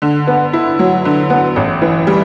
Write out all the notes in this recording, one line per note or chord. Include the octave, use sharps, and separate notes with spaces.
D3
B3
E4
F#3
D3
B3
A1
E3
G3